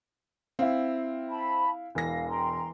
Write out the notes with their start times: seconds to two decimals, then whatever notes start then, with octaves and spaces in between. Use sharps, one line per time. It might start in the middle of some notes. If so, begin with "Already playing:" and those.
0.59 C4 E4 F5
1.29 A5 B5
1.95 E1 E3 F5 A#6
2.29 G5 A#5 C6